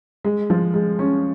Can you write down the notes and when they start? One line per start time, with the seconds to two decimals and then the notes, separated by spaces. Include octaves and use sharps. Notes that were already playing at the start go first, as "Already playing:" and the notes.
0.24 G#3
0.50 F3
0.74 G#3
0.99 C#4